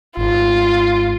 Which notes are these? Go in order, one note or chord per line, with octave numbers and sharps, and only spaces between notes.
G#1 F4